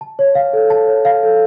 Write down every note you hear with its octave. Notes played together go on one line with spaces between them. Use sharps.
A5
C#5
F5
A4
A5
C#5
F5
A4